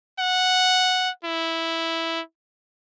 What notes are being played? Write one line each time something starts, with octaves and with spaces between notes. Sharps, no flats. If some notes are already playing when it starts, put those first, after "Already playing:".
F#5
E4